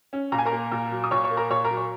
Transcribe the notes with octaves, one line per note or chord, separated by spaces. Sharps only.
C#4
A#2 A#5
G#5
A#4 A#5
A#3
A#2
F#3
D#6
A#2 C#5 C#6
C#5 C#6
A#3
A#4 A#5
A#2 C#5 C#6
A#4 A#5
F#3
C#5 C#6